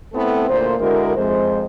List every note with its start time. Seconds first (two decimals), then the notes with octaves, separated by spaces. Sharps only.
0.14 A3 B3 C4 E4 A4 B4
0.48 D2 A#2 A#3 C5
0.80 D3 G#3 E4 F#4 A#4
1.15 F2 G#3 C5